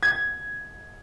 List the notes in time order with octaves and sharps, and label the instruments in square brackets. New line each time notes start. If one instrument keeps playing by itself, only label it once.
[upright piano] G#6